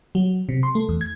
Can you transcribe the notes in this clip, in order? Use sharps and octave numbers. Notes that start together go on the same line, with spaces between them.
F#3
C3
C6
A3
E2
G#6